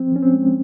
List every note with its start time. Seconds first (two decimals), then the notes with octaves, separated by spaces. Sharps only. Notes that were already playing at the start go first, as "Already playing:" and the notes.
Already playing: F3 C4
0.11 F3 C#4
0.23 C4
0.33 G#3